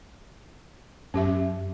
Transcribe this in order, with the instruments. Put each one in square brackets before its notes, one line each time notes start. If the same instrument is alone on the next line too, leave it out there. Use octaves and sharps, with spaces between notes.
[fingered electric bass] F#2 [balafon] C#4 G4 E5